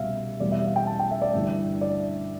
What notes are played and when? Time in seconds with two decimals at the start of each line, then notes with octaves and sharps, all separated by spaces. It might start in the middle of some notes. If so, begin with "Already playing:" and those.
Already playing: C2 B2 G3 E5 F5
0.40 E2 B2 G3 D5
0.51 E5
0.64 F5
0.76 G5
0.87 A5
0.99 G5
1.11 E5
1.22 D5
1.33 G1 G2 E3 E5
1.81 D5